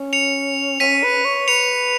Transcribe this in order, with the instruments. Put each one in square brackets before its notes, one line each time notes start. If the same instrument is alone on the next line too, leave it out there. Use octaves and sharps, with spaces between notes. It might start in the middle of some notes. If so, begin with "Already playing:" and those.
Already playing: [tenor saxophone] C#4
[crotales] C#7 F7
[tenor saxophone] C#4 [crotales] B6 D#7
[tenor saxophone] B4
C#5
[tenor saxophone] B4 [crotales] C#7 F7